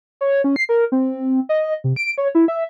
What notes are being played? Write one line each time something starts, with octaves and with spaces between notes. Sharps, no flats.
C#5
C#4
C7
A#4
C4
D#5
C3
D7
C#5
E4
E5